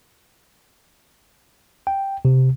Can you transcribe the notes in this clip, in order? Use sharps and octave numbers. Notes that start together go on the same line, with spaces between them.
G5
C3